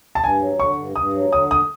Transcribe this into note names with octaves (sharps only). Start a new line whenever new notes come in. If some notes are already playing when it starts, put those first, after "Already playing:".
A5
G2 G#5
F#3
D3 C#6
G2
G2 D#6
F#3
D3 D#6
D#6